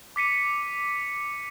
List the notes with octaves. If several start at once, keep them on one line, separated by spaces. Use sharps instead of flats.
D6 B6 C#7 D#7